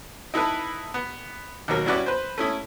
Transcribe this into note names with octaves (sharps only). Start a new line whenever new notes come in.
D#4 E4 A4 B4
B3
D#2 B2 F#3 A#4 F6
G3 C#4 E4 F#4 B4 D5
B4 C5
A3 C#4 E4 D#6